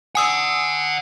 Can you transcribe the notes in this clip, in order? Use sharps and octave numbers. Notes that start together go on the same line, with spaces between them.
D5 F#5 G#5 D#6 E6